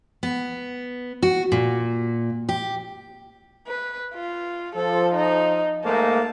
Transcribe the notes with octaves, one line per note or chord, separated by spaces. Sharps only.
B3
F#4
A#2
G4
B4
F4
F3 A4
D#4
G#2 A3 A#3 A5